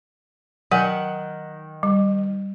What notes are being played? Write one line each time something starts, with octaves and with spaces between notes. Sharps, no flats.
D#3 F#3 F#5 G#5
G3